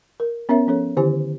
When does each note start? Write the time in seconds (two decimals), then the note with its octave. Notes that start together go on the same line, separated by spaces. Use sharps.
0.20 A#4
0.49 B3 C#4 A#4 C#5 E5
0.67 F3 C#4 A4 C#5
0.97 D3 D#3 E4 G4 C5 G#5